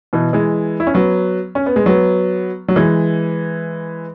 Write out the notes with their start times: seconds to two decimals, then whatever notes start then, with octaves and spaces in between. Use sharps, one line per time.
0.13 B2 E3
0.33 E3 G#3
0.80 E4
0.87 C#4
0.94 F#3 B3
1.55 C#4
1.66 B3
1.76 G#3
1.86 F#3 B3
2.68 F#3
2.76 E3 G#3